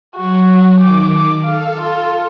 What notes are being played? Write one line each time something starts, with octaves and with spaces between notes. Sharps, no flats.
F#3 F#4
D#3 D6
D6
A4 F5
F4